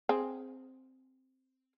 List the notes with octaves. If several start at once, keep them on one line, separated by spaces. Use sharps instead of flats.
C4 G#4